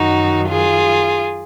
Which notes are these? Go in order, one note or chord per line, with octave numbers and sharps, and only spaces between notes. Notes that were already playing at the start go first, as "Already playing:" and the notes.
Already playing: F#2 D#3 F#3 D#4 F#4
F4 G#4